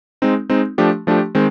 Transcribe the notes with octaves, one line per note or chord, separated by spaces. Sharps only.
G#3 C4 D#4
G#3 C4 D#4
F3 A3 D4 G4
F3 A3 D4 G4
D#3 G#3 C4